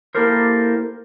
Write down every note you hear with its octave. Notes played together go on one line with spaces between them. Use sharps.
A#3 E4 G4 A4 A#4 C5